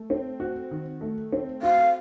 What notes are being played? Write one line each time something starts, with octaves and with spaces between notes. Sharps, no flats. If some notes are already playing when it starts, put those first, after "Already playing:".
Already playing: A3
C4
F#4
D#3
A3
C4
F#4 F5